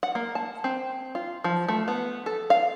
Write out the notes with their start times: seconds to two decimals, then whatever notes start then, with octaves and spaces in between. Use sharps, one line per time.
0.03 F#5
0.15 A#3
0.35 A5
0.64 C4
1.15 F4
1.44 F3
1.68 A3
1.88 B3
2.26 A4
2.50 F5